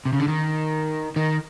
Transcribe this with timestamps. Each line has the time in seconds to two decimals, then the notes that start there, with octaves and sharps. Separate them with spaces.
0.06 C3
0.13 C#3
0.20 D3
0.28 D#3
1.16 D#3